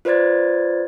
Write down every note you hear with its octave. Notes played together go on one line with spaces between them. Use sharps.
F4 B4 C5 D5 G#6 A6